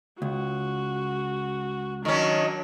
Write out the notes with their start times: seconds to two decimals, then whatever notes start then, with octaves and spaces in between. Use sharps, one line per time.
0.22 C#2 F#4
2.05 D#3 F#3 C#4 D4